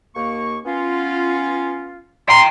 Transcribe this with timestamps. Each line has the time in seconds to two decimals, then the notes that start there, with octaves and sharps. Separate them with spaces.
0.15 D#2 A#3 C#6
0.65 B3 C#4 F4
2.29 G5 A#5 C6